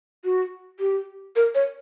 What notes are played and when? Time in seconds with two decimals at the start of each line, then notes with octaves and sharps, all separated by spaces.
0.24 F#4
0.80 G4
1.36 A#4
1.55 C#5